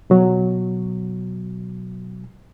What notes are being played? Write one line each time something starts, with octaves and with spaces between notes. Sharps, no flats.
B2 F#3